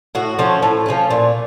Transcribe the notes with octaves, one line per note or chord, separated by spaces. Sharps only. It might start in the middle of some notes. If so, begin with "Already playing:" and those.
A2 F#4
F3 A3 C#4
A2
F3 A3 C#4
A#2